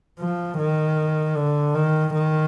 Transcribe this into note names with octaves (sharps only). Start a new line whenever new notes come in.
F3
D#3
D3
D#3
D#3